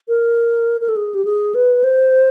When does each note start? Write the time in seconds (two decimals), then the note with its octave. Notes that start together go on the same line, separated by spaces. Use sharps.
0.08 A#4
0.81 A#4
0.89 A4
0.96 G#4
1.14 G4
1.25 G#4
1.55 B4
1.84 C5